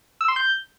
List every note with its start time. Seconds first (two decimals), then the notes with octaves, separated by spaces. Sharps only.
0.21 E6
0.28 C6
0.36 G6